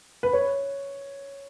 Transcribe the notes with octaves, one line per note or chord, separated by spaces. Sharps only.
B4
C#5